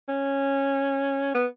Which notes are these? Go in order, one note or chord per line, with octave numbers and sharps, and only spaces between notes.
C#4
B3